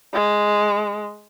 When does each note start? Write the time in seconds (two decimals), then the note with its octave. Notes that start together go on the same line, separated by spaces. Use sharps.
0.14 G#3